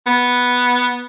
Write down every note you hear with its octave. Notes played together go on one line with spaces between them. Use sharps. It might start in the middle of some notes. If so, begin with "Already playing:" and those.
B3